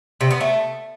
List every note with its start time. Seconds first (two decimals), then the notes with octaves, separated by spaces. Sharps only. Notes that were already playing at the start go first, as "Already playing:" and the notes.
0.21 C3
0.31 B3
0.40 A3